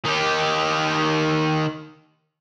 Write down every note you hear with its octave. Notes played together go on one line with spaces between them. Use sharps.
D#3 G4